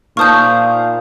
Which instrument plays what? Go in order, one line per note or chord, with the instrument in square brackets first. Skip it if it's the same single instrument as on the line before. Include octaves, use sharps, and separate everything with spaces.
[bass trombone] A#2 [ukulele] D#4 C5 A5 [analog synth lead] F5 [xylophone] C#6 D#6 G6